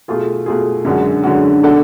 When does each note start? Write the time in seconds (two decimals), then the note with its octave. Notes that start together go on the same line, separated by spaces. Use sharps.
0.08 B2 A3 F4 G#4
0.46 B2 A3 F4 G#4
0.85 F#2 D3 G#3 C#4 F#4
1.24 F#2 D3 G#3 C#4 F#4
1.63 B2 A3 D4 F#4 A4